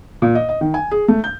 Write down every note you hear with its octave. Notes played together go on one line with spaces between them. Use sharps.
A#2
D#5
D#5
D#3
G#5
G#4
A3
G6